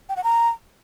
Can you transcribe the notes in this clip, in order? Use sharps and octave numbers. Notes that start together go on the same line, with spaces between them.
G5
F#5
A#5